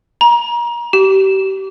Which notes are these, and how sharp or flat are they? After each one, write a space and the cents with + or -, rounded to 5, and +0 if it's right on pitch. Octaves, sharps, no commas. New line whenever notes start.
A#5 +30
G4 -30